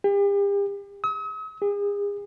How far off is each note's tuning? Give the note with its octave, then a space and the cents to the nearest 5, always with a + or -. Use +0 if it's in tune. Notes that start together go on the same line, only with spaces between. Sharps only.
G4 +40
D#6 +45
G#4 -40